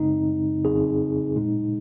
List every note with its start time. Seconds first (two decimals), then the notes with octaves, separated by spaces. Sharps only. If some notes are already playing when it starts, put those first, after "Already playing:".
Already playing: F#2 C#3 G#3 C4 D#4
0.64 F2 C#3 F#3 C4 D#4 G#4
1.36 A#2 G#3 D#4